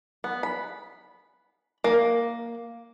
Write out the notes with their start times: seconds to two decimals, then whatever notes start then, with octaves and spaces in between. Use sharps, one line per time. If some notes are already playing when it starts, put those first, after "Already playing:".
0.24 B3
0.43 B5
1.84 A#3